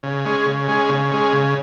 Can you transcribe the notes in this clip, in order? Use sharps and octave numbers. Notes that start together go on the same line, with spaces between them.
C#3
G#3 C#4
C#3
G#3 C#4
C#3
G#3 C#4
C#3